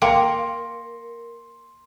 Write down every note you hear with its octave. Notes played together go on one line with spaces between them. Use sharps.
A#3 A#4 G5 C6 C#7